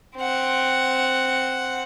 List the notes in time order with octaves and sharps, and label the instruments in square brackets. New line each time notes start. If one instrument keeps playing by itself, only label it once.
[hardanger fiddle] C4 F#5